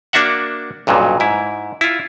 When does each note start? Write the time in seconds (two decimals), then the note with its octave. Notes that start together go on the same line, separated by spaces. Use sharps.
0.13 A#3 D4 F#4 E5 F#5
0.87 B1 G2 A#2 C#3 F#3
1.20 G#2 E4
1.81 E4 F4